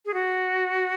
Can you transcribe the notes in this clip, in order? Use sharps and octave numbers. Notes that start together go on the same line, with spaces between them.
G#4
F#4